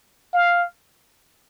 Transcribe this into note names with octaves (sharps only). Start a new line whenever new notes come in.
F5